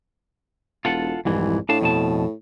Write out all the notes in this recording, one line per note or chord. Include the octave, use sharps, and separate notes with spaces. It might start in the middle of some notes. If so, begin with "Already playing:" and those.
E1 F4 A4 F#5
C2 F2 G#2 E3
A2 D4 F5 A5
F2 B2 A5